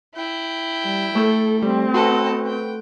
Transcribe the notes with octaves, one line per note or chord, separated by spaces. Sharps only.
E4 G5
G3
A3 A4 E6 G6
G3 C4
F#4 A4 B4 D#5 F#5 C6
G5